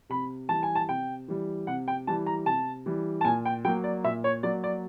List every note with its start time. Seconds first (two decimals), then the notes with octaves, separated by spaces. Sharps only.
0.10 C3 B5
0.49 E3 G3 A5
0.63 G#5
0.75 A5
0.89 C3 G5
1.28 E3 G3
1.67 C3 F#5
1.88 G5
2.07 E3 G3 A5
2.26 A#5
2.46 C3 A5
2.86 E3 G3
3.21 A5
3.25 A#2 G#5
3.45 G5
3.65 F#3 A#3 G5
3.84 D5
4.04 A#2 E5
4.24 C#5
4.43 F#3 A#3 D5
4.64 D5